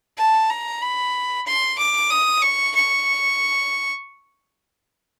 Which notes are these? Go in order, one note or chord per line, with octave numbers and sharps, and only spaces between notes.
A5
A#5
B5
C6
D6
D#6
C#6
C#6